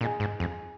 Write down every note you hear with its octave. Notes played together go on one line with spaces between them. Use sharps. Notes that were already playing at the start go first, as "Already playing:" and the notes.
A#2 D#4 G#4 D#5 G#5
G#2
F2